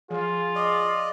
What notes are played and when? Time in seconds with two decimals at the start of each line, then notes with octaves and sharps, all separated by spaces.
0.10 F3 F4 G#4
0.56 D5 D#5